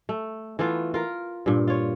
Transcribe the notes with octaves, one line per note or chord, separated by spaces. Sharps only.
A3
E3 A3 B3 F4
F4 A#4
G2 A#2
F4 C#5